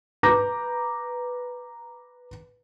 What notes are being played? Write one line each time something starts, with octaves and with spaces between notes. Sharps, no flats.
B4 A#5 D6 G6 A#6